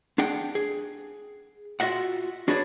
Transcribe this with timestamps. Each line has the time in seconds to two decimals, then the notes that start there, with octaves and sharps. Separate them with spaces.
0.18 D4 G#4 F#5 G5
0.55 G#4
1.80 F4 F#4 D#5 E5 F#5
2.48 D4 F#4 G#4 B4 C#5 D5